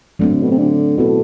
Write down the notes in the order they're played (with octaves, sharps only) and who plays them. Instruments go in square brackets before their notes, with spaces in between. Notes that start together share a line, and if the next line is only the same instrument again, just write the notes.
[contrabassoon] D3 [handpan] F#3 A3 C4
[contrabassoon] B2
C3
D3
[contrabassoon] B2 [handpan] F#3 C4 E4 A4